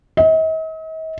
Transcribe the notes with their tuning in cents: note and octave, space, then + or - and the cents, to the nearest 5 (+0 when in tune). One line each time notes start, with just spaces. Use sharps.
D#5 +45